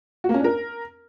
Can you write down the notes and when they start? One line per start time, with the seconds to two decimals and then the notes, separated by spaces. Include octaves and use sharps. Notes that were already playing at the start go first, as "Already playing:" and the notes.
0.24 F#4
0.29 A#3
0.34 C#4
0.39 D4
0.44 A#4